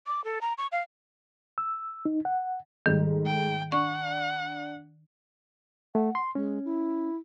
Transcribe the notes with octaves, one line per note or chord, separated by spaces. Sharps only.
D6
A4
A#5
C#6
F5
E6
D#4
F#5
G#2 D#3 G3 A3
G5
D4 F#5 C#6
A3 F#5
C6
G#3 C#4
E4